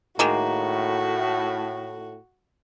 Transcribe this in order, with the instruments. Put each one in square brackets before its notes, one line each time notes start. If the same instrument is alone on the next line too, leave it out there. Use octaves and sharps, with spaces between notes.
[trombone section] A2 [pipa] D#3 G#3 A#3 [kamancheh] F#4